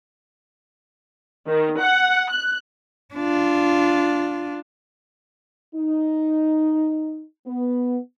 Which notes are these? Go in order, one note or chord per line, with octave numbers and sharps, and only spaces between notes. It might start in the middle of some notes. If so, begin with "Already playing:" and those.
D#3
F#5
F#6
D4 F4
D#4
B3